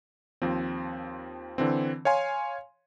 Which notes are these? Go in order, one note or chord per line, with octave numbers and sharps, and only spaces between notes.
D#2 F3 C4
D3 E3 C4
C#5 F5 G#5 C6